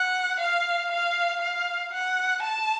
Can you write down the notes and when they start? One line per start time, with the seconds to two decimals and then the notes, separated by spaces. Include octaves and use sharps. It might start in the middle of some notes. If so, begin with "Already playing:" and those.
Already playing: F#5
0.41 F5
0.91 F5
1.42 F5
1.93 F#5
2.44 A5